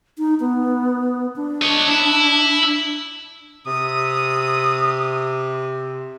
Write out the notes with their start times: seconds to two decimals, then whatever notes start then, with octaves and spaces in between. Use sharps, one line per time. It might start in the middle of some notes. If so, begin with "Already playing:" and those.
0.18 D#4
0.40 B3
1.36 D4
1.62 C#5 D#5
1.89 E4
3.67 C3 D#6